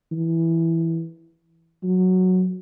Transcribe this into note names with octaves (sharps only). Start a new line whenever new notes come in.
E3
F#3